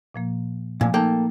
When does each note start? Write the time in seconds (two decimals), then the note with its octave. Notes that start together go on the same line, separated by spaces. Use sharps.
0.15 A#2 F3 A#3
0.81 A#2 F3 A3 G#5
0.94 A#3 D#4 A4 G5